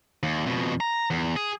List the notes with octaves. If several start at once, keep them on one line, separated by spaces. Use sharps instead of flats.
D#2
F2 B2
A#5
E2
G#4